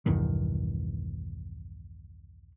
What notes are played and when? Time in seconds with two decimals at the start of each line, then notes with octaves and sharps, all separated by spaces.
0.06 B1 E2 G2 D#3